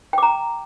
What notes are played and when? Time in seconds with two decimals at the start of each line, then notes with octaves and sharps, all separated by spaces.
0.13 G5
0.18 D6
0.23 A#5